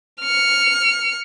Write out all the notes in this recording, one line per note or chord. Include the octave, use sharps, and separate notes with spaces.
F6 C#7